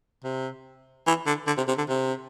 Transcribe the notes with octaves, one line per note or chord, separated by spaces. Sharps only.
C3
E3
D3
D3
C3
C3
D3
C3